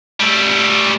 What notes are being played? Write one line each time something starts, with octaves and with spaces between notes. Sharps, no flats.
G3 A3